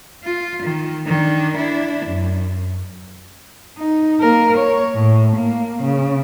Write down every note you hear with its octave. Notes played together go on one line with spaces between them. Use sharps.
F4
D#3
D#3 D4
D4 E4
F#2
D#4
A#3 A#4
C#5
A2
A#3
C#3